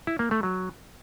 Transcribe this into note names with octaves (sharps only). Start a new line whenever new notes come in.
E4
A#3
A3
F#3